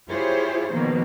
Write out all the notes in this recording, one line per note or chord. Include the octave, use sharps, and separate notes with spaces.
E4 F4 G4 G#4 C5 C#5
B2 D#3 F3 A#3